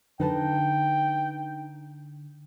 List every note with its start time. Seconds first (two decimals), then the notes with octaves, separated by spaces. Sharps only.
0.20 D3 D#4 B4 G5 A5